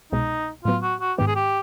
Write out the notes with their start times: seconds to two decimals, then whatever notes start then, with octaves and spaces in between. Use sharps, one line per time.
0.12 C2 B2 G#3 D#4
0.65 A2 F#3 B3 F4
0.82 F#4
1.01 F#4
1.18 G#2 D#3 G#3 B3 G4
1.27 G#4
1.35 G4